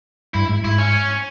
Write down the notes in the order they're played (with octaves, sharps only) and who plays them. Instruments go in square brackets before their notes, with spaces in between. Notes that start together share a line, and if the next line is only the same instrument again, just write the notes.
[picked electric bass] G2 [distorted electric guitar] E4
[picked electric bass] G#2
[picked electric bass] G#2 [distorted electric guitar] E4
[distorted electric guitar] C#4